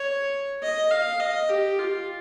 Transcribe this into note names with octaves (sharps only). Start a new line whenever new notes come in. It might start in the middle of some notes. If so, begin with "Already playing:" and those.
Already playing: C#5
D#5
F5
D#5
G4
F4